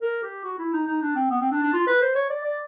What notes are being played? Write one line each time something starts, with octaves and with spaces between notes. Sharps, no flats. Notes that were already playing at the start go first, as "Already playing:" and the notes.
A#4
G4
F#4
E4
D#4
D#4
D4
C4
B3
C4
D4
D4
F4
B4
C5
C#5
D5
D5